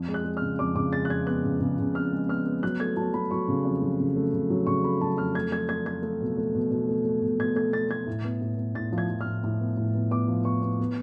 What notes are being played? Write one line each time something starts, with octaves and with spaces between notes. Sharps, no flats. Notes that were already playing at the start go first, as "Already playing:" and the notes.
Already playing: F2
G#3
F#6
G#3
C#3 F6
F2 D6
C#3 D6
G#3 A6
F#6
F2 G#6
B3 F#6
C#3
C#3
C#3
F2 F6
G#3
B3 F6
B3
F#3 F#6
A3 G#6
F#3 A5
F#3 B5
F#3 C#6
C#3
F2
F#3
C#3
A3
C#3
F#3
C#3 C#6
A3 B5
F#3 A5
F2 F6
A3 G#6
A3 G#6
A3 G#6
A3 G#6
A3
B2
A3
B2
B2
A3
A3
B2
B2 G#6
A3 G#6
B2 A6
A3 G#6
A2
B3
A2
B3
A2 A6
F3
G#6
F3
F6
A2
A2
B3
A2
B3
B3 D6
F3
B3 C#6
B3
B3